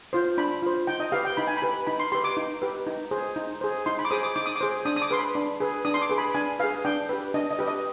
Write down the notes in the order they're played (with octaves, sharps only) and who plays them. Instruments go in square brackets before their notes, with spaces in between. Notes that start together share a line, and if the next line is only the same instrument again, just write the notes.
[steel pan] F4 C5
D4 B5
F4 C5
D#4 G5
D#5
G4 B4 F5
G5
D#4 B5
G#5
B5
G4 B4
D#4 B5
C6
G4 B4 C6
D6
D#4
G4 B4
D#4
G#4 C5
D#4
G#4 C5
D#4 C6
B5
D6
G#4 C5 D#6
D6
D#4 D6
D#6
D6
G#4 C5
D4 D#6
D#6
D6
G#4 B4 C6
B5
D4
G#4 B4
D4 D#6
C6
D6
G#4 B4
B5
D4 G#5
B4 F5
G#4
D4 G5
G4 B4
D4 D#5
D#5
G4 B4
D#5